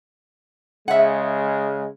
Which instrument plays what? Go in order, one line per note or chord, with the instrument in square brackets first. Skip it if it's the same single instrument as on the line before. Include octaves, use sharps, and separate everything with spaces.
[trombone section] C#3 G#3 [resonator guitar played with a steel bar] E5 F#5